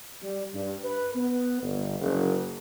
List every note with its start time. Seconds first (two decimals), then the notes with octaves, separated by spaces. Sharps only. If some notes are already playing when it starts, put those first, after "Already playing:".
0.22 G3
0.53 G2
0.82 B4
1.15 B3
1.62 G1
1.99 F#1